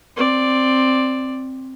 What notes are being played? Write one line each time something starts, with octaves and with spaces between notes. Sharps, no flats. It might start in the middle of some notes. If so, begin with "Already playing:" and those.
C4 D5